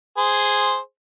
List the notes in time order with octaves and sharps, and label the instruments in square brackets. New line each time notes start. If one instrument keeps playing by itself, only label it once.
[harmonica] G#4 C5